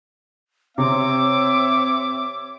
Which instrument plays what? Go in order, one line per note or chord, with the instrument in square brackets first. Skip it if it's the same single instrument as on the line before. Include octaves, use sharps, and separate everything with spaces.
[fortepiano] C3 [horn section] C4 C#5 E5 [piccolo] D6